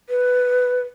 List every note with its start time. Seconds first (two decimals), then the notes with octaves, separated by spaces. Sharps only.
0.09 B4